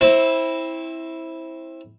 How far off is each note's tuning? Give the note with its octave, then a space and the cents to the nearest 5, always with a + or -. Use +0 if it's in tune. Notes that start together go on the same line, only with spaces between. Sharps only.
C4 +20 E4 -10